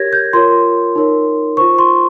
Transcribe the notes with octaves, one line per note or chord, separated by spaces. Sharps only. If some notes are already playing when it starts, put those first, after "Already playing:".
Already playing: G4 A#4 C#5 G#6 A#6
G6
F4 A#4 C#5 C6
D#4 A#4 C#5
F4 C5 C#6
C6